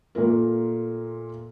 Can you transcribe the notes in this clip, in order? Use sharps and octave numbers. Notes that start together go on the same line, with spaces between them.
A#2 A3 F4 A#4